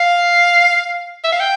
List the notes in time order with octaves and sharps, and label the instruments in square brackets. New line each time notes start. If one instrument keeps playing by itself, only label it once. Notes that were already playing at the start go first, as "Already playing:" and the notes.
Already playing: [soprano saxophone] F5
E5
F5
G5